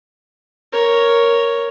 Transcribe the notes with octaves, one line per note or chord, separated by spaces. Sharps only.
A#4 C#5